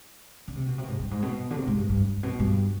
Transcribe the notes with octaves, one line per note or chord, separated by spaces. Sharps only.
D3
C3
B2
C3
B2
G#2
G2
G#2
B2
D3
C3
G#2
G2
G2
G2
B2
G2